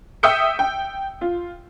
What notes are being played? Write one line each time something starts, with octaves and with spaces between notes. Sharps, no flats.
E5 G5 D#6 E6 G6 C#7
G5
F4